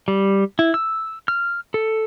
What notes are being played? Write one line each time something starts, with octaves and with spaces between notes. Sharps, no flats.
G3
E4
E6
F6
A4